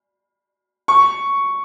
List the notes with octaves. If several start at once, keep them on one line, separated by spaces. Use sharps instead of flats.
C#6